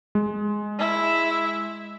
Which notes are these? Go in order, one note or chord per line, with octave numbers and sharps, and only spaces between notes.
G#3
E4